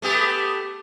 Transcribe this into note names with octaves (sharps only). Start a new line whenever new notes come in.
A3 B3 G4